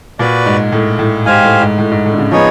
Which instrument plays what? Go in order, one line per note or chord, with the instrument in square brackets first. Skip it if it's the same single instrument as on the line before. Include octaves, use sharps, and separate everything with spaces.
[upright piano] A#2 [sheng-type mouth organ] F#4 B4 D5
[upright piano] G#2
A2
A2
[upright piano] G#2 [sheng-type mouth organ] G4 C5 F5 G#5
[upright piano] A2
G#2
A2
G#2
A2
D3
C#3
[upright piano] F3 [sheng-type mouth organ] B3 D#4 G#4 C#5